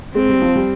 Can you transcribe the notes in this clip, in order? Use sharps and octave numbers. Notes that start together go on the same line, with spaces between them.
G#3 C4
G3
F3
G3